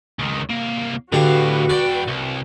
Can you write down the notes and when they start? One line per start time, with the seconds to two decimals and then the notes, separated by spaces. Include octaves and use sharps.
0.19 C#2 D#3
0.50 C2 A#3
1.13 A2 D3 F#4 G4 B4 F5
1.70 E2 D5 G5
2.08 C2